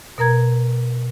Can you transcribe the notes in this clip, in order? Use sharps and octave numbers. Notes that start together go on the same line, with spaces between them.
B2 A#4 A#5 G#6